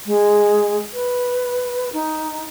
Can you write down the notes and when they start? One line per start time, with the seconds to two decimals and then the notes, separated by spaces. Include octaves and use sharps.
0.06 G#3
0.93 B4
1.93 D#4